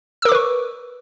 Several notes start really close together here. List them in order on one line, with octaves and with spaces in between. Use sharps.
E6 A#4 D6 B4 C#6